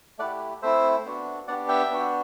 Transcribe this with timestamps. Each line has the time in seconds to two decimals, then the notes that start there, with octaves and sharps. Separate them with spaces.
0.19 A3 E4 G4 D5 F#5
0.62 A3 C4 E4 C5 E5
1.05 B3 D4 F#4
1.48 B3 D4 G4 D5 F#5
1.69 E5 G5
1.90 B3 D4 F#4